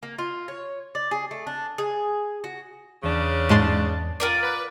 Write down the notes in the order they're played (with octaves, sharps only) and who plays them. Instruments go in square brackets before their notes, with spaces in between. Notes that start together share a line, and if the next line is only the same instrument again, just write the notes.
[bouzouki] A#3
F4
C#5
D5
G#4
A3
D4
G#4
F#4
[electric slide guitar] E2 [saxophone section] C#3 C#4 D4
[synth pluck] G#2 G#3 C6 [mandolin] A5
[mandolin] F4 A#4 D5
[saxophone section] B4